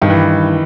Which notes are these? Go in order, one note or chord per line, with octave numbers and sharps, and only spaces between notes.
G2 D#3
E3